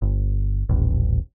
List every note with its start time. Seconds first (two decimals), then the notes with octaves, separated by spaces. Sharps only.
0.02 G1
0.69 D#1 A1